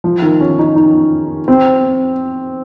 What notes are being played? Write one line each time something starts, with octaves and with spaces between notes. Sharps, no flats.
F3
D#3
C#4
D#4
D#4
C4